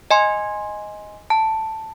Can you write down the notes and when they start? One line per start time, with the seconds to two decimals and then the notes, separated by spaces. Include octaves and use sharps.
0.11 D#5 G#5 C6
1.30 A5